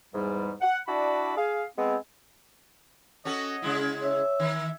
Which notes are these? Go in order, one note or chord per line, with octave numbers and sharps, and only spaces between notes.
E2 G#2 G3
F#5
D4 E4 F#4 D5 A5 B5
G#4 F5
G#3 B3 C4
C#4 F#4 A4 D#5
C#3 G#3 E4
C#5 E5
D#3